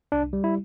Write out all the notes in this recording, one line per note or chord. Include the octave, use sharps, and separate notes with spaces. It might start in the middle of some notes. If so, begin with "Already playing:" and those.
C2 D4
G3
E4